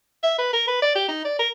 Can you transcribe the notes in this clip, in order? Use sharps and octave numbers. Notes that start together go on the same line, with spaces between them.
E5
B4
A#4
B4
D5
G4
D#4
D5
A#4